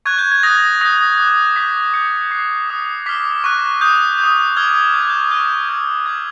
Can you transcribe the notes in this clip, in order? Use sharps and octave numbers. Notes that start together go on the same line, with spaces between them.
C#6 F#6 G#6
G6
G#6
D#6 F#6 A#6
D#6 G6 A#6
D6 F#6
D6 G6 B6
D6 G6 C#7
D6 F#6 C7
D#6 F#6
D6 F6 B6
C#6 F#6
D#6 G6
D#6 G6
D6 F6 G#6
C#6 G6
F#6 G#6
G6
C#6 F6 G6
C#6 E6 G6 G#6
D6 G6 G#6